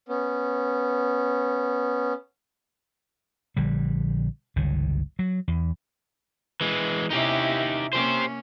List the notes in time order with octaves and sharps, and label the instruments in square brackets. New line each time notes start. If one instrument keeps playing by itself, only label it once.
[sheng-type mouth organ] B3 C#4
[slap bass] A#1 D3 G3
G1 C#2 D#3
F#3
E2
[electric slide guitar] E3 G#3
[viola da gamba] C3 C#4 E4 [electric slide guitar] D#4 G4
[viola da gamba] A#3 C#4 [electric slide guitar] G4 C5